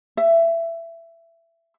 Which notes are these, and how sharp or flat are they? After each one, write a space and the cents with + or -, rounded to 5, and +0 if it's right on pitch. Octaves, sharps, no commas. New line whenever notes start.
E5 +20